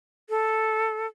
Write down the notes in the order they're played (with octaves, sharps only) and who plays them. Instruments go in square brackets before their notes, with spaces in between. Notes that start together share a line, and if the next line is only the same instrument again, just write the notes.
[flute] A4